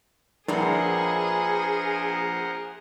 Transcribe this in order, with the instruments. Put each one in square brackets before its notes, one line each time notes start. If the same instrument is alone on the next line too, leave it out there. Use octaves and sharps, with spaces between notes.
[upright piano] A#1 [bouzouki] A#2 A#3 B3 [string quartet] G#4 [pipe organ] A#4 C5 F#5